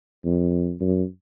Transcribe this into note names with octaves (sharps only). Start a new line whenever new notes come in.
F2
F#2